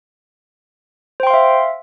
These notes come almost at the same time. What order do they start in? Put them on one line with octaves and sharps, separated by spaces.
C5 G5 C6 F5 E5